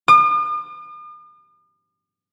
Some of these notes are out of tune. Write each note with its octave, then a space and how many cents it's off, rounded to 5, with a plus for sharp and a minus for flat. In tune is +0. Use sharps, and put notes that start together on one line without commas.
D#6 -45